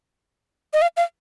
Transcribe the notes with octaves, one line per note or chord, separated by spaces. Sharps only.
D#5
F5
F5